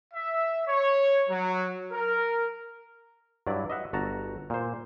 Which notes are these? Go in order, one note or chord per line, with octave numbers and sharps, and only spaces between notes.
E5
C#5
F#3
A#4
G2 F#3 E4 D5
D#5 E5 F#5
G1 F#4 A5 A#5
A#2 C5